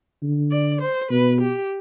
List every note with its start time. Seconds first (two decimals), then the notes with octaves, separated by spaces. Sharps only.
0.23 D3
0.52 D5
0.81 C5
1.11 B2 B4
1.41 G4